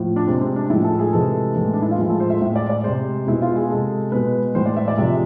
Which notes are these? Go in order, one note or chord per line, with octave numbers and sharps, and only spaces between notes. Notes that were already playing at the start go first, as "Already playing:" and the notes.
Already playing: A2 F3
D4
C3 G#3 C4
C4
D4
A2 F3 G#3 E4
A4
G#4
C3 E3 G#3 A4
A2 E3 G#3
D4
E4
F4
A2 F3 G#3 G#4
A4
C5
E5
A2 G#3 E5
D5
D5
C3 G#3 C5
B2 G#3 E4
F4
G#4
C3 G#3 A4
B2 G#3 B4
A2 E3 G#3 C5
D5
E5
D5
C3 F3 G#3 E5